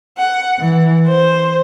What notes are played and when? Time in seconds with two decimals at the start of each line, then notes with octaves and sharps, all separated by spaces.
0.17 F#5
0.59 E3
1.07 C5